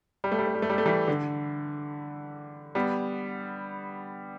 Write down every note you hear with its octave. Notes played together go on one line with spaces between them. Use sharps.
G3
A3
G3
A3
G3
A3
G3
A3
E3 G3
D3
G3 B3